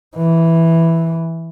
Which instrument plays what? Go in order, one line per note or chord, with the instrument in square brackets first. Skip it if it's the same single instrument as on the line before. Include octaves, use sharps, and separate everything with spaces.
[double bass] E3